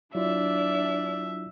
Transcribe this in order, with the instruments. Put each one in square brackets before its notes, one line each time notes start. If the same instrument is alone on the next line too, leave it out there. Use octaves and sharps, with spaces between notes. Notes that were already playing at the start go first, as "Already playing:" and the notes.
[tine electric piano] F#3 E4 F4 [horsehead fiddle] D4 [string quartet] D5 [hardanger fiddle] E5